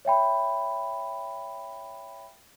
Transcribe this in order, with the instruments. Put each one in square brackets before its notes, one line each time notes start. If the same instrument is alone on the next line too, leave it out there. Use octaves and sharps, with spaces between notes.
[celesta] C#5 E5 G5 B5